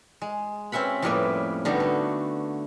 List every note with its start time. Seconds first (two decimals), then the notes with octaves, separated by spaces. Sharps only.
0.21 G#3
0.72 C4 C#4 E5 F#5 B5
1.02 F2 A2 G3 A#3 B4 E5
1.65 D3 G3 B3 D#4 F#4
1.80 A3